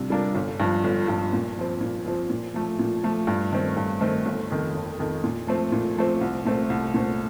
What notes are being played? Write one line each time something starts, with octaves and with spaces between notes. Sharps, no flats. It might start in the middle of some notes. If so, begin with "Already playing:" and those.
Already playing: C3 G3 D4 F4
G3 D4 F4 A#4
G1
G2 F3
G1
G2 F3
A#2
F3 C4
A#2
F3 C4
A#2
F3 A3
A#2
F3 A3
G2
D#3 A3 C4
G2
D#3 A3 C4
G1
F2 D#3
G1
F2 D#3
A#2
F3 A3 C4
A#2
F3 A3 C4
C2
A#2 A3 C4
C2
A#2 A3 C4